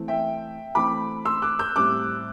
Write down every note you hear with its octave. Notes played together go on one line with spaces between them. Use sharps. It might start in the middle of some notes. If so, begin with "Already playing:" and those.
Already playing: E3 A3 C4
E5 G5
E3 A3 C4 B5 D6
C6 E6
D6 F#6
E6 G6
A2 G3 C4 D6 F#6